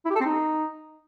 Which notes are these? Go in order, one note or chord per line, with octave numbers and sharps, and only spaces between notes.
E4
G4
A4
C4
D#4